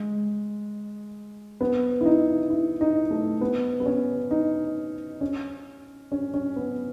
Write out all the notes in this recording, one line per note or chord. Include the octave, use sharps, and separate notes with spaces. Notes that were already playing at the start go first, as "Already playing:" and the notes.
Already playing: G#3
B3
E4
D#4
E4
D#4
A3
B3
B3
C#4
D#4
C#4
C#4
C#4
B3